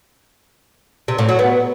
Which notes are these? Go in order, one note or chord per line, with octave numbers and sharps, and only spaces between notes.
C3
A2
F#3
B3